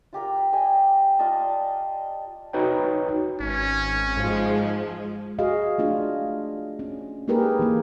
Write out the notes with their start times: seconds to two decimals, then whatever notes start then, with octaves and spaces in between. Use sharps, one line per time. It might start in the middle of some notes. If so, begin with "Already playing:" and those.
0.13 F4 G4 A#4 G5
0.53 G4 D#5 G5 G#5
1.19 F4 D5 D#5 A5
2.53 D#4 F#4 B4 C#5 G5
3.40 G#1 C#4
4.17 G#2 F3 G#3
5.39 F#4 G#4 D#5 F5
5.78 A3 D4 F4
6.79 C#4
7.28 A#3 D#4 G4 G#4 A#4 B4
7.59 E3 A#3